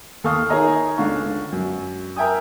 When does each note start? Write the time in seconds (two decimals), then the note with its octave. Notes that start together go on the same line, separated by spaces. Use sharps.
0.24 D#2 A4 F5 C#6 D#6 F6
0.49 D#4 G#4 A#4 C#5 D#5 A#5
0.97 C#2 D3 D4 F5 C#6
1.52 F#2
2.16 A#4 E5 G5 G#5 D#6